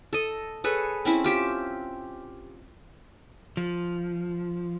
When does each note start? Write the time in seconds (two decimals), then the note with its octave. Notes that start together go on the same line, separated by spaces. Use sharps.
0.13 A4 D#5
0.64 G#4 A4 B4 C#5
1.05 C4 C#4 E4
1.24 F4 G4 E5
3.57 F3